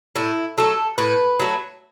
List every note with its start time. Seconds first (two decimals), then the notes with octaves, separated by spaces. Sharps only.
0.16 A2 E4
0.58 F#3 A3 A4
0.98 A2 B4
1.40 F#3 A3